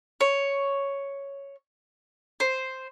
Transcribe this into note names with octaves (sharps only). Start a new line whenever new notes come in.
C#5
C5